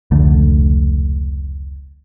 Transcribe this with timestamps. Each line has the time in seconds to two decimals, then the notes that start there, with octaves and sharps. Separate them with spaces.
0.11 F1 C#2 D3 A3